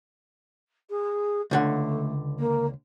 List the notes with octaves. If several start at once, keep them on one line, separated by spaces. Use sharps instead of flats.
G#4
C#2 D3 A3 F#5
A#3